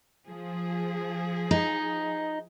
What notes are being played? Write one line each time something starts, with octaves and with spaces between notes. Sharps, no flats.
F3 G#4
D#4